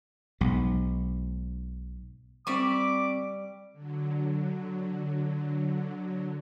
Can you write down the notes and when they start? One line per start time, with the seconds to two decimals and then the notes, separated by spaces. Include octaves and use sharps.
0.41 B1 G#2
2.47 G3 C4 D5 E5 C#6 D6
3.73 D3 F#3